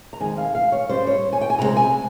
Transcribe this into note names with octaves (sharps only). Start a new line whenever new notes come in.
A#5
F2 D#3 G#3 G#5
F5
F5
C#5
G#2 G3 C#4 C5
C#5
G#5
G5
G#5
C3 D#3 G#3 C4 A#5
A#5
G#5